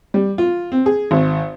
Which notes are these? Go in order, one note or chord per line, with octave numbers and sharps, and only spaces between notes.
G3
F4
C4
G#4
G#1